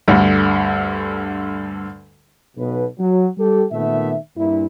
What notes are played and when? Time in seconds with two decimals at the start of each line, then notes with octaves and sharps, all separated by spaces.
0.08 D2 G2 D3
2.57 B1 B2 B4
2.99 F#3
3.37 G3 G4 A4
3.72 A#2 D#3 A3 B3 E5
4.37 G2 A#2 E4